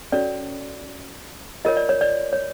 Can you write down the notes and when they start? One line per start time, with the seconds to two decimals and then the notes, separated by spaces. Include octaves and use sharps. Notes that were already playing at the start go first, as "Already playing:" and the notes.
0.12 C#4 F#4 A4 C#5 D5
1.65 F4 A#4 C#5 D#5
1.77 D5
1.89 C#5
2.01 D5
2.33 C#5